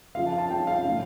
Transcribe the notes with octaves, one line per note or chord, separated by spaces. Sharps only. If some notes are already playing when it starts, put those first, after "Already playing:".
C#3 F3 C#4 F5
A5
A5
C#3 F3 C#4 G5
F5
A2 F3 C#4